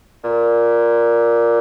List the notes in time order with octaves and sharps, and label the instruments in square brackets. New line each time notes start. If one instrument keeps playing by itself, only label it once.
[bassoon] A#2